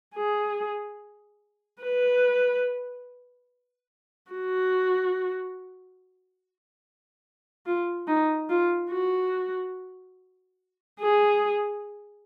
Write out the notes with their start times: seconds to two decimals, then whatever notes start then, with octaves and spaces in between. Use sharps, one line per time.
0.15 G#4
1.82 B4
4.32 F#4
7.66 F4
8.07 D#4
8.49 F4
8.91 F#4
10.99 G#4